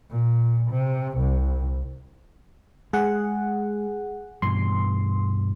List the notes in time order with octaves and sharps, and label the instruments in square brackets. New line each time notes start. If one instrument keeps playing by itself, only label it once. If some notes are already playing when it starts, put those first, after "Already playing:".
[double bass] A#2
C3
C2
[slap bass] G#3 [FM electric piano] G#4 F#5
[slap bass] G2 B2 E3 [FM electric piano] C6